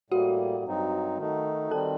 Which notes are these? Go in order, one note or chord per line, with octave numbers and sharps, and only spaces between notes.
A2 G3 A#3 F#4 F#5
G2 F#3 C4 D#4
D#3 A3 D#4
D#3 G3 C4 A4 A5